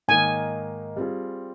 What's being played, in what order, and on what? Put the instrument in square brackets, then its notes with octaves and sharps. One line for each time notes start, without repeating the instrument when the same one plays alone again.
[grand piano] G#2 D#3 A#3 [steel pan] G#5
[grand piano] G3 C4 F4 G#4